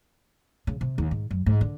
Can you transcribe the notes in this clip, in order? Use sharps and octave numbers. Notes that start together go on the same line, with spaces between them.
C#3
C3
D#2
G#2
F#2
G#2
D3